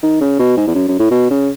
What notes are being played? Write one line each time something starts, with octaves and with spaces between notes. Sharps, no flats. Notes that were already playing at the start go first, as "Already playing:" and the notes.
D#3
C#3
B2
G#2
E2
F#2
F#2
A2
B2
C#3